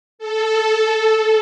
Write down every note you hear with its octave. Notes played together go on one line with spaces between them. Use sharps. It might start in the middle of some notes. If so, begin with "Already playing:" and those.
A4